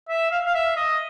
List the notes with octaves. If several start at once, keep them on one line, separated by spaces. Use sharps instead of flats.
E5
F5
F5
E5
D#5